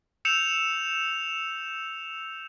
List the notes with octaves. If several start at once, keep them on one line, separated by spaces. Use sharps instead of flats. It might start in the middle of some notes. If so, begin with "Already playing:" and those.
E6 G6 C#7 E7 F7